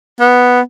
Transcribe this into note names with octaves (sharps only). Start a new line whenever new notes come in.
B3